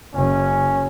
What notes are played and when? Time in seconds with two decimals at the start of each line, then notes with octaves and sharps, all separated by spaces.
0.15 F#1 C#4